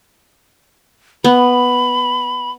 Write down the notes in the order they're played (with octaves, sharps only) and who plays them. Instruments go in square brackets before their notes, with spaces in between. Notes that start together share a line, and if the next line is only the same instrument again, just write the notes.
[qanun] B3 [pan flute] B5